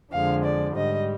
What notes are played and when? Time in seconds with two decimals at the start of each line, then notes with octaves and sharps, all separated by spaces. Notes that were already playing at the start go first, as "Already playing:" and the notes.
0.11 F2 D3 F3 G#3 F5
0.44 D5
0.75 G#2 G3 D#5